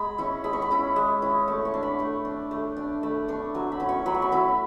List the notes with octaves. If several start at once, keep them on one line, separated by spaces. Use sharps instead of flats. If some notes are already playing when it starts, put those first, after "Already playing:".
Already playing: G#3 B5
C#4 E4 C#6
G#3 B5
C#6
B5
C#4 E4
G#3
C#4 E4
A3 C#6
C#6
D4
B5
A3 C#6
D4
A3
D4
A3 B5
D4 C#6
F#3 C#6
B5
C#4 E4
C#6
F#3 B5
C#6
B5
C#4 E4